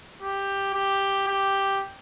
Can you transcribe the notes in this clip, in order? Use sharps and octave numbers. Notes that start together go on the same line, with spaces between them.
G4
G4
G4